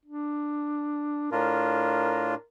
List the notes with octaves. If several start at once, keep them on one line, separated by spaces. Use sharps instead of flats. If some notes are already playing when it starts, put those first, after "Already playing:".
D4
A2 D4 F4 A#4